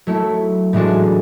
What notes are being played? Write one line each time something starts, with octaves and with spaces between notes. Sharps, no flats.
F#3 A3 E4
A2 E3 G#3 D4 F#4